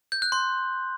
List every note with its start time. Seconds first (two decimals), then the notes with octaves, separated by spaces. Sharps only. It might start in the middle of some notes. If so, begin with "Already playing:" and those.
0.12 G6
0.22 F#6
0.32 C6